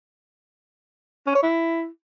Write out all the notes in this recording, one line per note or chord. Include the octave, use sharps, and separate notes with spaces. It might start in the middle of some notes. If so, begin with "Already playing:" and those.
C#4
C#5
E4